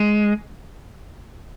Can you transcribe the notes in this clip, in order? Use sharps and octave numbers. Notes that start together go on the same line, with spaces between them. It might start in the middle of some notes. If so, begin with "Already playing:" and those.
Already playing: G#3